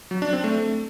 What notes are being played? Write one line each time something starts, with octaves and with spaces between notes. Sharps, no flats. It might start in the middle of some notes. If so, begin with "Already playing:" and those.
F#3
D4
C4
A3